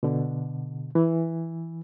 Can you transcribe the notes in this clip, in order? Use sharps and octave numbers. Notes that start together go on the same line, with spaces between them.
B2 D3
E3